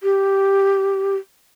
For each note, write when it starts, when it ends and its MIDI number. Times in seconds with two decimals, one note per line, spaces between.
0.03 1.16 67